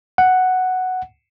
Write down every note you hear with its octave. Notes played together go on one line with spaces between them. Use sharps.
F#5